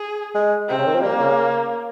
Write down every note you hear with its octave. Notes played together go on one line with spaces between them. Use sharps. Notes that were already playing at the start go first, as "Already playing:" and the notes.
Already playing: G#4
G#3
C3 C4
C#3
D#3
F3
G3 A#3
C#3